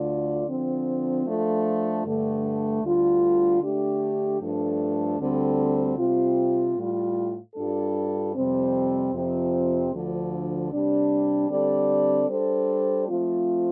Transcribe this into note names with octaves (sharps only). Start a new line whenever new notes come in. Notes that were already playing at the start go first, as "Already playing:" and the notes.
Already playing: D2 D3 A3 F4 D5
D3 F3 C4
F3 A3 D4 F4 A4
G2 D3 A3
D2 D3 G3 F4
D3 A3 D4 G4
G2 F3 A3 D4 A4
D2 D3 G3 C4 A4
C3 G3 C4 F4
A2 G3 F4
G2 G3 D4 F4 A4
F2 C3 G3 C4
F2 C3 F3 C4 F4
D2 D3 F3
C3 G3 D4
D3 G3 C4 A4 D5
G3 D4 A4 C5
F3 A3 C4 F4